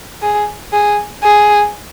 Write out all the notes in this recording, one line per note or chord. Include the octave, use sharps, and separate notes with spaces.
G#4
G#4
G#4